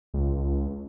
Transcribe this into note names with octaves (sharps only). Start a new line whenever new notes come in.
C#2